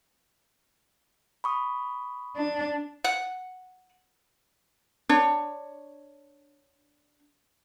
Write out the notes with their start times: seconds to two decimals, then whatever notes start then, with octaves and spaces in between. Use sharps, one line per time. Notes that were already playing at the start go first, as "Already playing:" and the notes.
1.44 B5 C#6 D#6
2.36 D4
3.04 F#5
5.09 D4 C#5